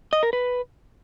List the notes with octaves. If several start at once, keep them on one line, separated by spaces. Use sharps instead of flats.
D#5
A#4
B4